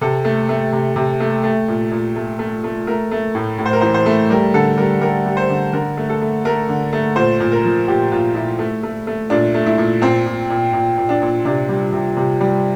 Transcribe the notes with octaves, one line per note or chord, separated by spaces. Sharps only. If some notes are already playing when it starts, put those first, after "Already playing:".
C3 A4
A3
A3
C3
C3
A3
A3
A#2
A#2
A3
A3
A3
A3 A#4
A3
A2
A2
C5
A#4
E3 C5
C5
A3
G3 A#4
D3 A4
G3 A#4
G3 A#4
G3
C5
D3
D3 A#4
A3
A4
A3
A3 A#4
D3
A3
A#2 C5
A#2
A#4
F3
A#2 G4
A#2 F4
A#2 E4
A3
A3
A3
A#2 D4
A3
E4
A#2
A#2 C4
A#2
A#2
A#2
A#2
D4
A#2
C3 D4
G3
C3
C3
G3